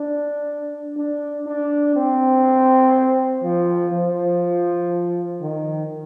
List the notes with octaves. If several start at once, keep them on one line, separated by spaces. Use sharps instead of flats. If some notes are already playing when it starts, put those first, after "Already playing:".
Already playing: D4
D4
D4
C4
F3
F3
D#3